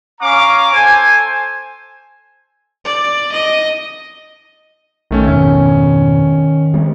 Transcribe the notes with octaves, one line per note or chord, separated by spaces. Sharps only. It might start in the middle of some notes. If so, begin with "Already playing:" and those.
C#4 F5 A#5 C#6 D6
A4 C5 G#5
D5
D#5
A#1 D#3 A3 C#4
F2 G#2 B2 D#3 C#4
G3 G#3 C4